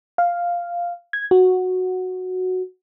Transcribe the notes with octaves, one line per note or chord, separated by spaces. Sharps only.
F5
G#6
F#4